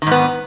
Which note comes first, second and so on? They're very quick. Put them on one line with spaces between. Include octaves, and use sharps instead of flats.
D#3 G#2 B3